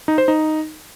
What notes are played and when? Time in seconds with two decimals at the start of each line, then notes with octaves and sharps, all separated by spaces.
0.08 D#4
0.18 C5
0.28 D#4